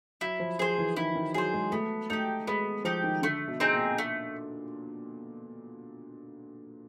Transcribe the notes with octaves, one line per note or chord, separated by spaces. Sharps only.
F#3 E4
F3
F3 G#4 C5
E3
D#3 E4
D#3
F#3 G#4 C5
G#3
A3 B3
A3 D#4 G4
G#3 B3
F3 D#4 G4
D#3
D3 A3
B2
C4 D#4 G#4
A#2
A3